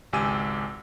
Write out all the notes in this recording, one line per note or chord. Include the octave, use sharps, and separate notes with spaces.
G#1 C#2 G4 G#5 E6 D#7